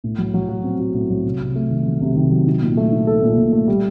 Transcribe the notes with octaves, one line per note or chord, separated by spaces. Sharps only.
A2
F#3
F#3
F#4
C4
F#4
A2
F#3
C3
C3
A3
D#3
F#3
C3
D#3
F#3
D#4
A#2
A3
D#4
A4
A#2
A#2
A3
G3